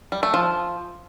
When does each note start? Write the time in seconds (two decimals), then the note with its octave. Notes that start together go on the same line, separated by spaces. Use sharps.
0.12 G3
0.23 A3
0.34 F3